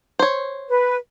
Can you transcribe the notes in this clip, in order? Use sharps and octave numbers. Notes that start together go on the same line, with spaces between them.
C5 C#5
B4